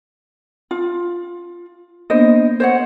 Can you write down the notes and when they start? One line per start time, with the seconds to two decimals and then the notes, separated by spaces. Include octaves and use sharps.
0.71 F4
2.10 A#3 B3 D4 C5 D#5
2.60 C5 C#5 F#5